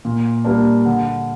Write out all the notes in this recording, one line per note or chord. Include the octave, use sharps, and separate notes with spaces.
A#2
G3 A#3 D4
D3